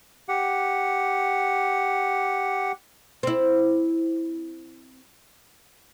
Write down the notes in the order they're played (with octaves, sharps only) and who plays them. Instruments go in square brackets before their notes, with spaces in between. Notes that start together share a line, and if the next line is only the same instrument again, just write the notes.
[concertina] G4 F#5
[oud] C4 E4